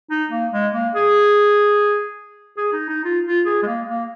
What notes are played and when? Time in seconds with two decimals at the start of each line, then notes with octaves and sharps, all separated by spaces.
0.11 D#4
0.31 A#3
0.52 G#3
0.73 A#3
0.95 G#4
2.57 G#4
2.73 D#4
2.89 D#4
3.05 F4
3.26 F4
3.46 G#4
3.63 G#3
3.67 A#3
3.88 A#3